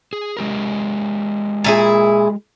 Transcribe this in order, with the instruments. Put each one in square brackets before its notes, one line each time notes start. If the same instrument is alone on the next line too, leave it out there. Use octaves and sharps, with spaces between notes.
[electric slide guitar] G#4
G#3 G4 A#4
[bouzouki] A#2 E4 G#4